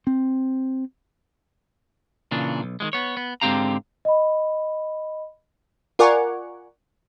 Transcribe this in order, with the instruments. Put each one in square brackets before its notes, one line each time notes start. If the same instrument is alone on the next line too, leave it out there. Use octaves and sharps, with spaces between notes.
[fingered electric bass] C4
[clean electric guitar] A#2 C#3 E3 D4
B1
D#3 F3 G#3
B3 C#5
B3
G#2 D3 C4 G4 F5 A#5
[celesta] D#5 B5
[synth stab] F4 A#4 D5 F#5 G#5 C#6